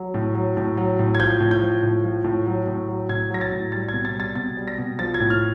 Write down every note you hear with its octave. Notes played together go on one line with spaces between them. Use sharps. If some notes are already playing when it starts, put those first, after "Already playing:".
Already playing: F#3
A2
F#3
A2
F#3
A2
G#6
F3 G6
A2
G6
F3
A2
F3
A2
F#3
A2
F#3
A2 G#6
F#3 A#6
A6
A2
G3 A6
B2 G#6
A6
G3 A6
B2 A6
G3
A#6
B2
F3 A6
G#6
A2
F6